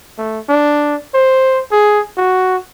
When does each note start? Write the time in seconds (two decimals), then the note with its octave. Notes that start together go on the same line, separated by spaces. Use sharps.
0.18 A3
0.49 D4
1.14 C5
1.72 G#4
2.17 F#4